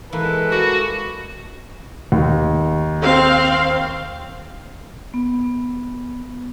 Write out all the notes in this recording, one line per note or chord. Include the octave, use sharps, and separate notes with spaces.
E3 G#3 A#3 A4 B4
A#3 F#4 D5 F#5
D#2
C4 F5
B3